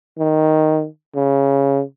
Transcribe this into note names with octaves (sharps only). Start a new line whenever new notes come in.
D#3
C#3